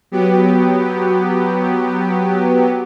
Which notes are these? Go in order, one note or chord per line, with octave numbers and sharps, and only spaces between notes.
F#3 B3 G4